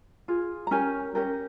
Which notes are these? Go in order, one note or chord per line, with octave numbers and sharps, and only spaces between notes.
F4 G#4
A#5
C#4 G4 A#4 G#5
C#4 G4 A#4